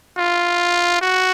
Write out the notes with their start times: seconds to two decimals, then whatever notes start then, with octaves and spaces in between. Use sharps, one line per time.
0.18 F4
1.02 F#4